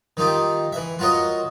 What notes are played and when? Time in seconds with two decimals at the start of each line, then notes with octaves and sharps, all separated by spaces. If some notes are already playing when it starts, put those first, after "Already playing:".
0.17 D#3 D#4 F4 G4
0.72 E3 E5
0.99 F4 F#4 A#4 C#5 D#5